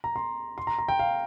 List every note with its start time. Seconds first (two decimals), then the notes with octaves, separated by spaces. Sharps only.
0.04 A#5
0.16 C6
0.58 C6
0.67 A#5
0.78 A#5
0.88 G5
0.99 F5